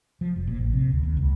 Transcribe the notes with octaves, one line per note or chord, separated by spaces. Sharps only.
F3
F1
A#2
A1
C3
D2
D#2
C#2